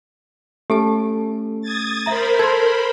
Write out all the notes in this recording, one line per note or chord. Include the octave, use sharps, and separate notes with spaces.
A3 C#4 G4 A4 A5
D#6 G#6 A6
A#4 C5 E5 A#5 B5
A4 C6 G#6